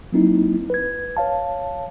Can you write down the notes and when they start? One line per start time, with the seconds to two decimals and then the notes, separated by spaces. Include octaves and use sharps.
0.12 F#3 A#3 C4 D#4 E4
0.70 B4 G#6
1.17 C#5 F5 A5